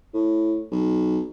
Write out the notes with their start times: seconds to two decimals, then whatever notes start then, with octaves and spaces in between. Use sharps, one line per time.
0.14 A2
0.71 B1